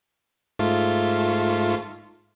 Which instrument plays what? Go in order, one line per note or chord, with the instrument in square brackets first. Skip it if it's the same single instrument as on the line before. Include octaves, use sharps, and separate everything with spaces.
[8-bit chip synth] G#2 A3 F4